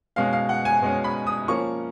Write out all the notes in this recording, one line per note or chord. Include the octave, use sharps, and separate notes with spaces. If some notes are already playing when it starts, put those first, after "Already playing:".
B2 G#3 C#4 F5
F5
F#5
G#5
B2 G#3 C#4
B5
D#6
F3 A#3 C#4 C#6